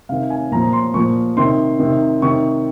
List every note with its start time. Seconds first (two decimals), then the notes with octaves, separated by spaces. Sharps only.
0.09 C3 D#3 F5
0.30 G#5
0.52 A#2 F3 A#5
0.73 C6
0.94 A#2 F3 C#6
1.37 C3 D#3 C6
1.80 C3 D#3
2.22 C3 D#3 C#6